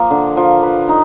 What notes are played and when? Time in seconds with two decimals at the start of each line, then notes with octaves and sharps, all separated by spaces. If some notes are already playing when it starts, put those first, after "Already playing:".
Already playing: F3 A#3
0.11 D3
0.37 F3
0.63 B4
0.89 D#4